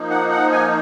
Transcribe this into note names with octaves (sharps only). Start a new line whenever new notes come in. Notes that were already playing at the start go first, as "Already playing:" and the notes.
Already playing: F3 A#3 D#4
F#5
F#5
G#5